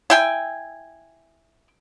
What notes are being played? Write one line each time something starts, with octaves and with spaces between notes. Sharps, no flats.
E4 G5 G#5